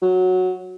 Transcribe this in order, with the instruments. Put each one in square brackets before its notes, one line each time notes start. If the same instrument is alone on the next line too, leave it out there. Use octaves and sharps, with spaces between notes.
[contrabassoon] F#3